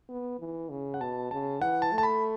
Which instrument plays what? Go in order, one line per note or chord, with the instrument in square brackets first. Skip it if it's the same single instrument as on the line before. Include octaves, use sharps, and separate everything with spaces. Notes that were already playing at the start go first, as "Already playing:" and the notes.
[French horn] B3
E3
C#3
[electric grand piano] F#5
[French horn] B2 [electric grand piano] A5
[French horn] C#3 [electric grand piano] A5
[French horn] E3 [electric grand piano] F#5
[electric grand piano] A5
[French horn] A3
[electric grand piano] A5
B5